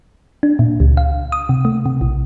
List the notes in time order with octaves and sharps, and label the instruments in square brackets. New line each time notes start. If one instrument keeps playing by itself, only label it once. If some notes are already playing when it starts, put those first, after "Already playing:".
[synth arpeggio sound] D4
A#2
C#2
F5
D#6
C3
A3
C3
A#1